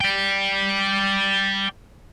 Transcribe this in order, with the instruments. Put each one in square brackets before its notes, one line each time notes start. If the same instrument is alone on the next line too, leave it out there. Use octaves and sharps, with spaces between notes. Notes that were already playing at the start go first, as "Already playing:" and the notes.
[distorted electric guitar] D5 G5